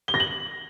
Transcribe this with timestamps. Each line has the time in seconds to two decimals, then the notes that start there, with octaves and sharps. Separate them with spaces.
0.08 G7
0.14 A#6
0.20 F#7